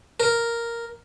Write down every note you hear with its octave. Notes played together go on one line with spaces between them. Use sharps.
A#4